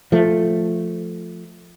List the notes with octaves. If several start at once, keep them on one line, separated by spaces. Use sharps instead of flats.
F3 A3